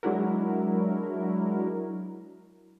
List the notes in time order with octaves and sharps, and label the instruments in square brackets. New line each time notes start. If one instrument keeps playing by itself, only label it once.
[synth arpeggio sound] F#3 G#3 D4 E4 F#4 A#4